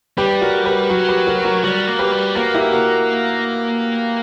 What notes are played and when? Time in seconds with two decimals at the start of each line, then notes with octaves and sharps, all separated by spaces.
0.18 G3 G4 B4
0.42 F#4 A#4
0.65 G4 B4
0.90 F#3 F#4 A#4
1.08 G4 B4
1.27 F#4 A#4
1.45 F#4 A#4
1.63 G3 F#4 A#4
1.87 A#3
1.99 G4 B4
2.12 G3
2.36 A#3 F#4 A#4
2.55 E4 G4
2.72 F#4 A#4